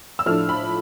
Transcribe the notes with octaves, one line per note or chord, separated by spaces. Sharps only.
E6
A2 F3 A3 D4 F6
B5